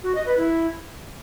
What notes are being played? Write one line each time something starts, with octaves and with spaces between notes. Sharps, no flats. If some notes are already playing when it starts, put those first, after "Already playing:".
F#4
D#5
B4
E4